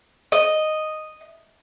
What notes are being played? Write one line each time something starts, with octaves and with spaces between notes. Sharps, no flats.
D#5